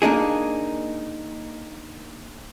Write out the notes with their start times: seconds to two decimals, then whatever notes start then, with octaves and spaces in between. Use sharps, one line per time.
0.02 A#3 D4 D#4 G#4